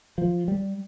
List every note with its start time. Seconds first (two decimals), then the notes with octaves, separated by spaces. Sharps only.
0.18 F3
0.48 G3